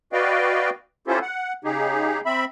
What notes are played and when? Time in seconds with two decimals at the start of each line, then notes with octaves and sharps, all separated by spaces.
0.13 F#4 B4 D5 D#5 F5 G5
1.07 C#4 E4 F4 G4 A4 C5
1.22 F#5
1.64 C#3 D#4 G4 G#4
2.26 C4 E5 B5